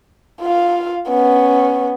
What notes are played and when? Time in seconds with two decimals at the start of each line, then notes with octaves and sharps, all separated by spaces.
0.42 F4 F5
1.08 B3 C#4